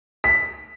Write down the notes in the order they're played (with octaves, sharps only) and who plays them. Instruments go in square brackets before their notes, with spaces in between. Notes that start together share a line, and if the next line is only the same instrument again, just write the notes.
[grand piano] B6